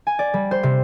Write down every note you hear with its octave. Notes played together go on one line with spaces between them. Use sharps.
G#5
D5
G3
C5
C3